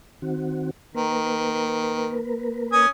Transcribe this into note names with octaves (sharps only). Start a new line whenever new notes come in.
D#3 C4 F#4
D#3 A#3 A#4 B4
C#4 G#5 D#6